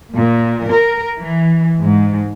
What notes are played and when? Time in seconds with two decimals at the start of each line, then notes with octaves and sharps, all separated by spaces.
0.12 A#2
0.67 A#4
1.17 E3
1.80 G#2